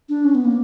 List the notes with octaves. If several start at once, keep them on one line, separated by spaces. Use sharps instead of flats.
D4
C#4
B3
A#3